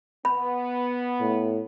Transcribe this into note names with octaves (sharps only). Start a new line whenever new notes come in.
B3 B5
A2